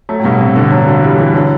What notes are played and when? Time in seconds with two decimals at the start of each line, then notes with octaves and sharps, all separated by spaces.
0.09 F#3 A3
0.20 A2
0.24 G2 B2
0.41 A2 C3
0.56 B2 D3
0.71 D3 F#3
0.87 D3 F#3
1.02 E3 G3
1.19 E3 G3
1.34 D3 F#3